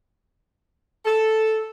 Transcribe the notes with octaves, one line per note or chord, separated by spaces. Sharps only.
A4